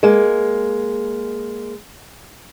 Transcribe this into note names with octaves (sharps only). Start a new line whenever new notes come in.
G#3 A#3